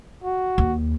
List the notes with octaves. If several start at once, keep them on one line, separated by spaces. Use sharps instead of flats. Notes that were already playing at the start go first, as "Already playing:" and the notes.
F#4
D#2